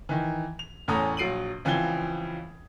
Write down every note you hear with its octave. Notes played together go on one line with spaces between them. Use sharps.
D#3 E3
F7
E2 A2 C#4 A4 A#5 D#6
A#1 F#3 C7 D7 D#7 F#7
C#2 E3 F3 C4 G#6 G7